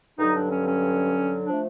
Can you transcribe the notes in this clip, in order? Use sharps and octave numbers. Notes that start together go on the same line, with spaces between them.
G2 D3 F#3 D#4
D4
C#4
C#4
F3 A3 D4